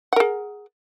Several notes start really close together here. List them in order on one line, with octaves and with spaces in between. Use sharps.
F#5 A#4 G#4